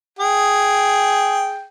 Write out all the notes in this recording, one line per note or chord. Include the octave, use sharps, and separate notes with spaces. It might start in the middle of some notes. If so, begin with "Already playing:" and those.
G#4 G5